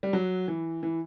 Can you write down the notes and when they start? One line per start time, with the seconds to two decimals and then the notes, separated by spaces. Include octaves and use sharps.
0.03 G3
0.13 F#3
0.48 E3
0.83 E3